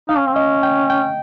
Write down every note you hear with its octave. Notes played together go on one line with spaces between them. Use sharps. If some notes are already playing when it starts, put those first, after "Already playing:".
D#4 F5
C#4
C4
C#4 D#5
G5
G5